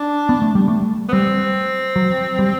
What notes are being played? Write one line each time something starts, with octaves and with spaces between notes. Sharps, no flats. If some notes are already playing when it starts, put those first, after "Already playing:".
Already playing: D4
B3
A3
G3
A3
B3
G3 C4
F#3
G3